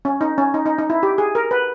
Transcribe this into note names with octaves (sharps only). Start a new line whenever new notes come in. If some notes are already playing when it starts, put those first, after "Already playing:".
C#4
D#4
C#4
D#4
D#4
D#4
E4
G4
G#4
A#4
B4